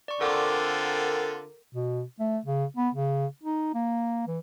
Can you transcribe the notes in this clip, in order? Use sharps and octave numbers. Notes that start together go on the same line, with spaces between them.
D5 C#6
D3 C4 F4 A4 A#4 F#5 D6
B2
A3
C#3
B3
C#3
D#4
A#3
E3